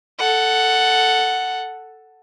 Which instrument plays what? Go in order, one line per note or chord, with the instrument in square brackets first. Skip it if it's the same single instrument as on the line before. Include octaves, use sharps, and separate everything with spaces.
[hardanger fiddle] A4 F#5